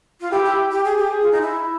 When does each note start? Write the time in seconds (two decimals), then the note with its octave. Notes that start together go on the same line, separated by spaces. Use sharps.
0.21 F4
0.31 E4 G4
0.44 E4
0.71 G4
0.84 G#4
0.97 G4
1.11 G#4
1.22 F4
1.31 D#4
1.42 E4